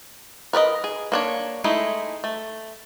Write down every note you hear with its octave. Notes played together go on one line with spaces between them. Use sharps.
A#4 B4 D5 D#5
G#4
A#3 D4 C#5
G#3 A3 D#4 E4
A3